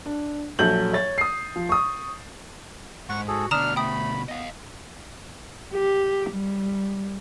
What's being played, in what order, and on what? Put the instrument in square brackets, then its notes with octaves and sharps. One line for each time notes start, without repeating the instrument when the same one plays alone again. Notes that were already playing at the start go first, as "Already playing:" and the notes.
[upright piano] D4
A#1 F#3 A4 G6 F#7
C#5 A6
D#6 C7
F3
C#6 D#6
[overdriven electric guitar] G#2 [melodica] F#5 C#6
[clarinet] F#4 [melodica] G#4 A4
[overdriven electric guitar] D2 B2 [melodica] D4 [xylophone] A#5 D#6 E7 [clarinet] F6
[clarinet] A3 [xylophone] G5 D#6 [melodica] B5
[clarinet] B3 [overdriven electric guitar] D#5 F5
[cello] G4
G3